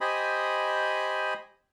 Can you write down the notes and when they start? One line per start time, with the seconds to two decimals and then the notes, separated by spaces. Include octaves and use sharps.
0.01 G4 C5 D#5 G#5 B5 D#6